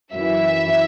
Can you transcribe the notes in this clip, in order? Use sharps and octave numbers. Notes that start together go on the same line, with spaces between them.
F#2 E3 E5